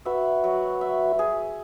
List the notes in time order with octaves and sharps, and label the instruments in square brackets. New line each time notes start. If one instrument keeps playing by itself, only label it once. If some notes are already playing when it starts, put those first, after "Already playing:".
[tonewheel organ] F#4 B4 [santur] E5
[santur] F#3
E5
G#4